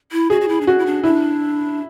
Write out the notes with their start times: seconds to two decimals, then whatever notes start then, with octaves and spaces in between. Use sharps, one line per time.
0.12 E4
0.30 F#4 G#4
0.41 F#4
0.48 E4
0.61 D4
0.67 C#4 F#4
0.79 E4
0.86 D4
1.04 D4 E4